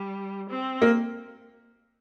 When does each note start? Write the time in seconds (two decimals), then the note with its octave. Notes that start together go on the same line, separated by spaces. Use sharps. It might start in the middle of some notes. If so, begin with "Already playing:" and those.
Already playing: G3
0.49 C4
0.82 A#3